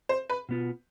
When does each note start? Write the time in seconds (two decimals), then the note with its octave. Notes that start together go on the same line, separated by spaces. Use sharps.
0.09 C5
0.30 B4
0.49 B2 B3 F4